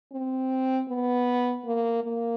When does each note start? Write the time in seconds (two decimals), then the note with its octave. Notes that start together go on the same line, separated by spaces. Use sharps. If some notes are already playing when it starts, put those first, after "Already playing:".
0.12 C4
0.89 B3
1.66 A#3
2.04 A#3